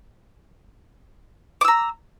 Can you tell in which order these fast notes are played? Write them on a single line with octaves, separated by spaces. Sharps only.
D6 E6 A#5